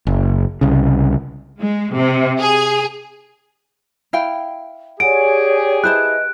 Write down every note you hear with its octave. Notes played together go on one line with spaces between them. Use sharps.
F#1
C2 C#3
G#3
C3
G#4
E4 F5 G5
G4 G#4 C#5 D5 F#5 G#5 D7
E4 B4 C5 D#5 A5 F#6